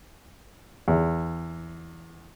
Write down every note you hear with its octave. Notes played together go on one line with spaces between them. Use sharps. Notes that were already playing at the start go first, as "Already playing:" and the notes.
E2